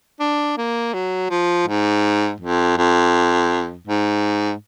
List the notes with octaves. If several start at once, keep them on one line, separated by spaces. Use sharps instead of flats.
D4
A#3
F#3
F3
G#2
F2
F2
G#2